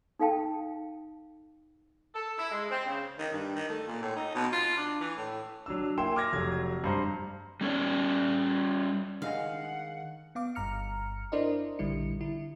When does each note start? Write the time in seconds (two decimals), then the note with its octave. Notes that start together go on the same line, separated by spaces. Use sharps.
0.19 D#4 A4 F5 G5 A5
2.14 A4
2.38 E4
2.52 G#3
2.70 C4
2.86 C#3
3.18 D#3
3.33 G2
3.56 D#3
3.69 A3
3.87 A#2
4.02 A2
4.16 D#4
4.35 B2
4.52 F4
4.77 D4
5.00 E3
5.17 A2
5.66 F#3 D4 E6
5.97 A#3 E4 G5 G#5 C6 E7
6.15 C6 D6 F6 G#6 A#6
6.33 F1 F#3 E6 G#6
6.84 G2 C5 A#5
7.61 G3 C#4 D#4 C#5 D5
9.22 D#3 G#3 D4 D#5 F5 F#5 G#5
10.35 B3 F5 D6
10.55 G1 G2 A#5 F6 C#7
11.32 D4 E4 A#4 C5 D5 D#5
11.79 A#1 D3 G3 E4 C#7
12.20 D3 E4